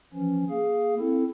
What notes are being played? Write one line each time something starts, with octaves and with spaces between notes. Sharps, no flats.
E3 F3 C#4
A#3 G#4 F5
C4 E4 A4